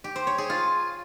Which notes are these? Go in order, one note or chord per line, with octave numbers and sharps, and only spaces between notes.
G4
C5
C#5
G#4
F4